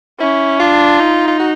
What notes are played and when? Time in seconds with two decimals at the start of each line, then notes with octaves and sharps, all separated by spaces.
0.20 C#4 E4
0.60 D4 F4
1.00 D#4
1.27 F4
1.40 F#4